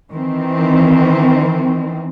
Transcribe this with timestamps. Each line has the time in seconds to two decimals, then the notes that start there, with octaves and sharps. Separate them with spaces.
0.11 D#3 E3 C4